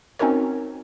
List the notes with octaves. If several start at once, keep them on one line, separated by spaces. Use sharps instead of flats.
C4 C#4 D#4 F#4 A#4 C#5